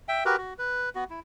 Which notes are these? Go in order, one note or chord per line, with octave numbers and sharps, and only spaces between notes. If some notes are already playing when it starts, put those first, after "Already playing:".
E5 G5
F#4 G4 A#4 B4
F#4
B4
B3 F#4
E4